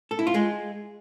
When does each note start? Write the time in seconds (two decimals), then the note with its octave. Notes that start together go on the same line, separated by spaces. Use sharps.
0.11 A4
0.19 E4
0.27 F4
0.34 G#3